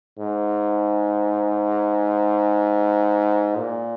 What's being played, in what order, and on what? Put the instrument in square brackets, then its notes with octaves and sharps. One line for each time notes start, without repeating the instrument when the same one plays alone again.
[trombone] G#2
A#2